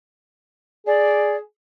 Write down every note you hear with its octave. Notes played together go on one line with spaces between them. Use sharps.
G#4 D5